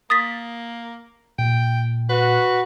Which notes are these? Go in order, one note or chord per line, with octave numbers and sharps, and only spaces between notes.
A#3 D#6 A6 B6
A#2 G5
F#4 B4